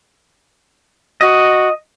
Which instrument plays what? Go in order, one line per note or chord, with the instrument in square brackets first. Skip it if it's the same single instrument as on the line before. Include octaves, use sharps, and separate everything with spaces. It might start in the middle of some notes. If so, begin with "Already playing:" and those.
[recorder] F#4 [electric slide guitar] D#5